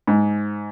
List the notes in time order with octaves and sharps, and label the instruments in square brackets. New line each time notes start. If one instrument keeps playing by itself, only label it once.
[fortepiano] G#2